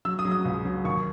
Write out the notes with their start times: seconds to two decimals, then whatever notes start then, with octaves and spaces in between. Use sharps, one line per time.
0.05 F#3 E6
0.19 D#6
0.25 F#3
0.31 D#6
0.45 C#2
0.65 F#3
0.85 D#2 C#6